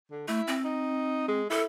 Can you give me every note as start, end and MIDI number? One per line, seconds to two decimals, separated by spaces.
0.11 0.25 50
0.28 0.41 57
0.28 0.56 64
0.48 1.42 60
0.64 1.27 63
1.28 1.46 56
1.50 1.65 64
1.50 1.64 69